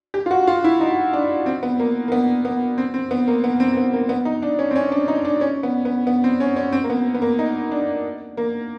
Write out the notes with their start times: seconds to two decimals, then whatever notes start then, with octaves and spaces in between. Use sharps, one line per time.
0.14 G4
0.26 F4
0.31 F#4
0.47 F4
0.64 E4
0.81 D#4
1.13 D4
1.46 C4
1.63 B3
1.79 A#3
2.08 A#3
2.12 B3
2.45 B3
2.78 C4
2.94 C4
3.11 B3
3.28 A#3
3.44 B3
3.60 C4
3.71 C4
3.77 B3
3.93 A#3
4.09 B3
4.25 D#4
4.42 D4
4.59 C#4
4.71 C4
4.76 C#4
4.92 D4
5.08 D#4
5.25 D4
5.41 C#4
5.63 B3
5.85 B3
6.07 B3
6.24 C4
6.40 C#4
6.56 C#4
6.72 C4
6.84 A#3
6.90 B3
7.15 B3
7.22 A#3
7.39 D#4
7.71 D4
8.37 A#3